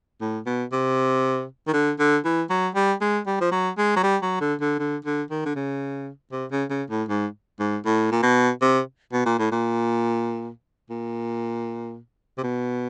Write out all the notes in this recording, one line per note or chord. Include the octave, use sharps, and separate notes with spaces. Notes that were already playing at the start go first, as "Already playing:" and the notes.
A2
B2
C3
D#3
D3
D3
E3
F#3
G3
G#3
G3
F3
F#3
G#3
F#3
G3
F#3
D3
D3
D3
D3
D#3
D3
C#3
C3
C#3
C#3
A2
G#2
G#2
A2
A#2
B2
C3
B2
A#2
A2
A#2
A#2
C3
B2